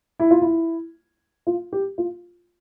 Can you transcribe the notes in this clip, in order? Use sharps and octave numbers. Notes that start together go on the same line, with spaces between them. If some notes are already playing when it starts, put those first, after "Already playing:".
E4
F4
E4
F4
G4
F4